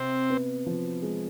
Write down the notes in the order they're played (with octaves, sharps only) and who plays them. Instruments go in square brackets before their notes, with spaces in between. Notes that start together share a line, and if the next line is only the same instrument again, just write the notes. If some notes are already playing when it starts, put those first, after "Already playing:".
Already playing: [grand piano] C3 [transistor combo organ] C4
[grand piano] B3
F3
G#3